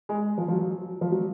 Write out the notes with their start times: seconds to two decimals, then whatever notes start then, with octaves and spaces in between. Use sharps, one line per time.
0.09 G#3
0.38 F3
0.48 F3
0.52 F#3
1.01 F3
1.12 F#3